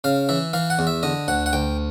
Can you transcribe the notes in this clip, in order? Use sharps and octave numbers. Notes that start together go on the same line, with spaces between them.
C#3 F5
E3 E5
E3 F5
F#5
E2
E5
D3 D#5
D2 F#5
F#5
D2 G5